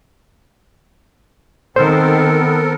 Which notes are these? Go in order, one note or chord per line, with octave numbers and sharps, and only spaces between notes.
D#3 B3 C4 A4 A#4 C5